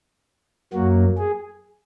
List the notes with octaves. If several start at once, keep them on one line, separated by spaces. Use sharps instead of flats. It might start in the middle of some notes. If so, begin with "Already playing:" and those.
F#2 F#3 A#3 F#4
G#4